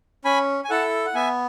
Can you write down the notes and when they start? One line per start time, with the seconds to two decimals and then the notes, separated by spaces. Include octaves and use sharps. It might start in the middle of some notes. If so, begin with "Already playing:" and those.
0.25 C#4 G#5 B5
0.64 G#5
0.70 E4 A4 F#5 A5
1.06 F#5
1.15 B3 E5 G#5